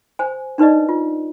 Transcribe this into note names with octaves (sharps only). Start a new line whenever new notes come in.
C5 G#5
D4 D#4 B4 D5 D#5
F4